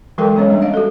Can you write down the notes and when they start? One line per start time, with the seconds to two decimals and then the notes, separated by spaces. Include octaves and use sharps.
0.18 E3 F#3 G#3 A4 A#4 G5
0.36 G#3 B3 C#4 C#5 D#5
0.49 G3 D4 E5
0.62 D#5 F5
0.74 F#4 A4